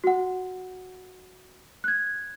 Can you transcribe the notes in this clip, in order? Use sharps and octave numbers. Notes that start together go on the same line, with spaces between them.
F#4 F#5
F#6 G#6